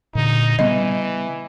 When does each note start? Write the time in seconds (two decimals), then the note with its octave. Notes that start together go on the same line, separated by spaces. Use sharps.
0.15 A#2 D3 D#4
0.59 C#3 E3 G3 B3 D#5